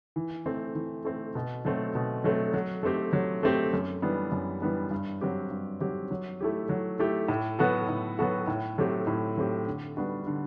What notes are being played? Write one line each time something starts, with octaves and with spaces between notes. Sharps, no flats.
E3
A3 C4
E3
A3 C4
B2
F#3 A3 C4
B2
F#3 A3 C4
F#3
A3 C4 G4
F#3
A3 C4 G4
F#2
E3 G3 B3 D4
F#2
E3 G3 B3 D4
G2
F#3 C4 G4
G2
F#3 C4 G4
F#3
A3 E4 G4
F#3
A3 E4 G4
A2
F#3 B3 F#4 A4
A2
F#3 B3 F#4 A4
A2
F#3 A3 C4 G4
A2
F#3 A3 C4 G4
D3
G3 B3 D4 F#4
D3